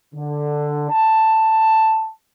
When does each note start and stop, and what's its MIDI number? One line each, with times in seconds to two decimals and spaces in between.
0.15 0.86 50
0.90 2.10 81